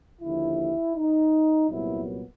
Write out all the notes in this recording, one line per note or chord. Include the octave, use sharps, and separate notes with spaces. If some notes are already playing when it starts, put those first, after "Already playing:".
D#2 D3 F3 E4
D#4
C2 A#2 F#3 B3 E4